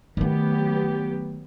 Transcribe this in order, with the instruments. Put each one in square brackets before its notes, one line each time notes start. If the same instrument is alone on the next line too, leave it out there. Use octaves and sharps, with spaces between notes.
[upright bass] D#3 A3 [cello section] F#3 B3 G4